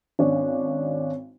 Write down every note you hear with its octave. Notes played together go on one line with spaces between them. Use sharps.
G#1 C#4 D4